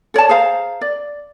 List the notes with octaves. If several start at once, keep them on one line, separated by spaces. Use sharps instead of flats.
A4 C#5 D5 A5
G#4 C5 F5 A#5
D5